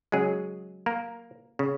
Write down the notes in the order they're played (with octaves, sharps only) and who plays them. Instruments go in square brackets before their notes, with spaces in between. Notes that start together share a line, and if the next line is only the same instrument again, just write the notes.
[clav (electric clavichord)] C#3 F#3 G#3 G#4
A#3 A#4
C#3